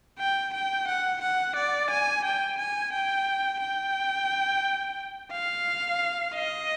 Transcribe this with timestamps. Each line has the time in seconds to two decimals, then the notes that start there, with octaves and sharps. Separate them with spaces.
0.19 G5
0.53 G5
0.87 F#5
1.22 F#5
1.56 D5
1.90 G#5
2.24 G5
2.58 G#5
2.93 G5
3.61 G5
5.32 F5
6.34 D#5